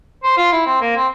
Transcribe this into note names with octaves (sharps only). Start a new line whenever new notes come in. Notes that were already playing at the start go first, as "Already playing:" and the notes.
C5
F4
E4
C4
A#3
C4